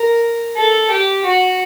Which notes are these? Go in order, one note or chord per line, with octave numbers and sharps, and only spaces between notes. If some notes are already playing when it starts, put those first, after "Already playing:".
Already playing: A#4
A4
G4
F#4